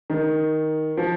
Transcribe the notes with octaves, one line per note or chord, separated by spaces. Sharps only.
D#3
F3